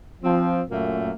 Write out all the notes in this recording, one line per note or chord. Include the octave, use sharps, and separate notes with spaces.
F3 C4
F#2 A#2 A3 A#3